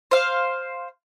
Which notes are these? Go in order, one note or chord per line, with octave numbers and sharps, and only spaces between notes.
C5 F5